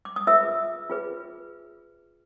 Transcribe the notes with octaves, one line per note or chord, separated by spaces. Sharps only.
D6
D#6
F4 G#4 B4 E5 E6
F4 G#4 B4